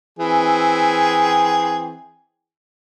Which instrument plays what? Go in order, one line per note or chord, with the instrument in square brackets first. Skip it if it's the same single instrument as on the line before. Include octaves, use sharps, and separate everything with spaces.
[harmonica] E3 C4 G#4